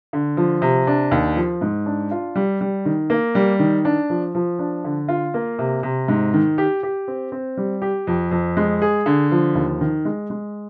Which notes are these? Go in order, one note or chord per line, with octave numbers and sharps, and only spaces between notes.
D3
F3
C3
D4
D#2
F3
G#2
D4
F4
G3
G3
D#3
A#3
G3
D#3
D4
F3
F3
D4
D3
F4
A#3
C3
C3
G#2
D#3
G4
G4
C4
C4
G3
G4
F2
F2
G#3
G#4
D3
F3
D#2
D#3
G#3
G#3